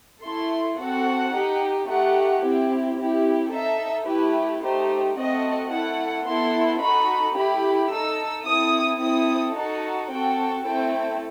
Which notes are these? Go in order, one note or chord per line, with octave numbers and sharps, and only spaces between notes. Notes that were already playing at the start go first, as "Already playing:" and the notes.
A3 E4 A4 C6
C4 F#4 A4 F#5
D#4 G4
A3 D#4 G4 F#5
C4 E4 G4
C4 E4 G4
D#4 A4 E5
A3 E4 G4 B4
A3 D#4 G4 C5
A3 C4 F#4 A4 D#5
A3 E4 A4 F#5
B3 E4 A4 C6
D#4 F#4 A4 B5
A3 E4 G4 B5
D#4 A4 E6
C4 E4 A4 D#6
C4 E4 A4 D#6
D#4 F#4 A4 A5
C4 F#4 A4 G5
A3 C4 E4 A4 G5